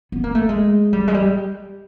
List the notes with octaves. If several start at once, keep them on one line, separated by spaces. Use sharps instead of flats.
B3
A#3
A3
G#3
G3
G#3
G3